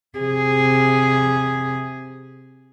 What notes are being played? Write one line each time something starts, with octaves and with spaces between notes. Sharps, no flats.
C3 G#4